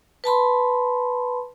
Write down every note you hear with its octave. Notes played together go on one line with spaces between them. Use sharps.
B4 A5 B5 C6